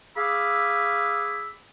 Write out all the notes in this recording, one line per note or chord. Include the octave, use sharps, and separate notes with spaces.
G#4 F5 B5 D6 E6